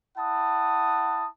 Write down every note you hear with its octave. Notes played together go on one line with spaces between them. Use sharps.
E4 F#5 A5 D#6